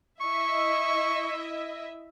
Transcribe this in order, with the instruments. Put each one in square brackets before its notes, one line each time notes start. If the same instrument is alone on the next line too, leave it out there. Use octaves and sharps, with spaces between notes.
[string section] E4 D#5 E5 [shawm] C#6